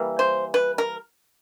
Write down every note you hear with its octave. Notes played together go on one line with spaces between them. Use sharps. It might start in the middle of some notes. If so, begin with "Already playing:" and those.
Already playing: E3 G3 A#3
C5
B4
A#4